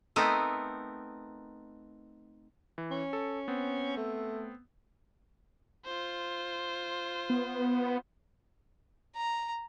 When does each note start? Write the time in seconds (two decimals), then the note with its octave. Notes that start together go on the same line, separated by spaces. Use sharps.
0.16 A3 B3 C4 D#4 A#4
2.78 E3
2.91 C#4
3.13 A4
3.48 B3 C4
3.97 A3
5.85 F4 C5
7.30 B3
9.16 A#5